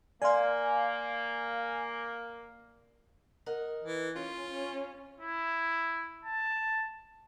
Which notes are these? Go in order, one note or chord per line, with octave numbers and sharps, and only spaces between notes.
A#3 D5 F5 G#5 C6
D#4 A#4 F#5
E3
C#4 F4 G#4
C#4
E4
A5